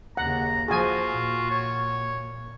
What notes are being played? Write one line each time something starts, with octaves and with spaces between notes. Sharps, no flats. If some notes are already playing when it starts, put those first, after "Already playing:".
D#2 C#3 F#5 A#5
F3 F4 F#4 G#4 G#5
A#2
C#5